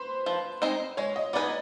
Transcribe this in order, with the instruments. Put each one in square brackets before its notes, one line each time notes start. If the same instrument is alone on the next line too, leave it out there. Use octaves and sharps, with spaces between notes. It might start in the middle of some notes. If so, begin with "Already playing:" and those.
Already playing: [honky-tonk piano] B4 C5
[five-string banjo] F3
G#3 C4 D#4
[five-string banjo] G#3 [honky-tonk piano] C#5
[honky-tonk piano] D#5
[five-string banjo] B3 D#4 G#4 B4 [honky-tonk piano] D5